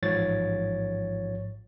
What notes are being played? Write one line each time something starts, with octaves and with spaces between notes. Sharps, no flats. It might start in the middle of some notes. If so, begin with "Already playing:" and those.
A1 G#2 F3 C#5 A6